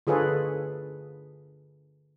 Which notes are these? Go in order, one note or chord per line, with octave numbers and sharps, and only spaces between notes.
D3 F4 G#4 A4 B4 C#5